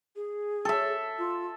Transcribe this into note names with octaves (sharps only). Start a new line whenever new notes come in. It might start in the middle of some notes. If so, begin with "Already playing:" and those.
G#4
A4 E5
F4